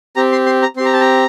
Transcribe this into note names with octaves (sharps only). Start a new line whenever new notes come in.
C4 G4 A#5
C6
C6
A#5
C4 G4 C6
A#5
A5
A#5